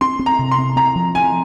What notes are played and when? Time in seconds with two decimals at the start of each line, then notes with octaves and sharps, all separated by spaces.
0.01 C4 C6
0.19 C4
0.26 A#5
0.39 C3
0.51 C6
0.58 C4
0.76 C4 A#5
0.96 F3
1.15 C4 G#5